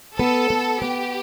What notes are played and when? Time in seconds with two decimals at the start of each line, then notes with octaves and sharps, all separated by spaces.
0.18 B3 A4
0.50 B3
0.82 B3 G4